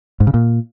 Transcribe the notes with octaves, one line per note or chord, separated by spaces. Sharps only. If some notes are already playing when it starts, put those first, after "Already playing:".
G#2
C#3
A#2